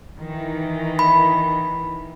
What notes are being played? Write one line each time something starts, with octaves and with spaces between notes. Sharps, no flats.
D#3 E3
B5